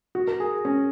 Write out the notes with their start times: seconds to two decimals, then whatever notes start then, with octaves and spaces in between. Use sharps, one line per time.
0.15 F#4
0.27 A#4
0.40 G#4
0.65 C#4